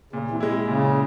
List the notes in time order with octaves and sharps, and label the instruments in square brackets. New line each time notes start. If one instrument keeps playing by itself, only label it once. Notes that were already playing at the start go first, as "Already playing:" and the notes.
[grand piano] A#2 [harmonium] C#3
[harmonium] C3 E3
[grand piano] G#3 E4
[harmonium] C3
[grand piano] A#2 [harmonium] C#3